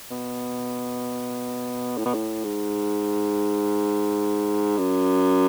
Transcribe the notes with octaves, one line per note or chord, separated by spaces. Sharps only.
B2
A2
B2
A2
G#2
F#2